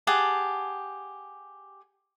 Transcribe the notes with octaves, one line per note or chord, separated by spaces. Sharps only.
G4 G#4 F#5 A5